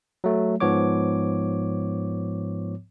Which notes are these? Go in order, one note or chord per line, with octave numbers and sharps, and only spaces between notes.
F#3 A3
G#2 F3 B3 C#5 D6